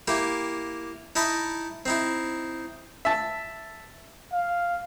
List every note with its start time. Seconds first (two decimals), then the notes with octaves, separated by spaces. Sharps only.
0.08 A#3 E4 G4
1.16 D#4 E4 D#5 A5 B5
1.86 C4 D#4 E4
3.05 E5 A5
4.33 F5